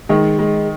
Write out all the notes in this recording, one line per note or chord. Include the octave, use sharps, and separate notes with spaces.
D#3 G#3
G#3